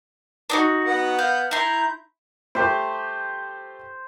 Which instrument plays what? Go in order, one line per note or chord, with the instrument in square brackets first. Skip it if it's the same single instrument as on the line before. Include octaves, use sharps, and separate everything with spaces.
[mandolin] D4 D#4 F#4
[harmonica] B3 F#5
[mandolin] F5 [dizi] G6
[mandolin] E4 C6 [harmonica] A#5 [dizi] G6
[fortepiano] A3 G4 [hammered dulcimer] C5